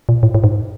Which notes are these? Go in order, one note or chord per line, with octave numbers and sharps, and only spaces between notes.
A#2
A2
A2
G#2